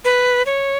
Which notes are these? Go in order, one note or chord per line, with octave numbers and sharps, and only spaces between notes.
B4
C#5